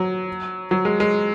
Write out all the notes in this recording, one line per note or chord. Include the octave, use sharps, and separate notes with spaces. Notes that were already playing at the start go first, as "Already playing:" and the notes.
Already playing: F#3
F#3
G#3
G#3